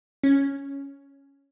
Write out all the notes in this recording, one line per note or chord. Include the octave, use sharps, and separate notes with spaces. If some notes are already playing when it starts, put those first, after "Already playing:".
C#4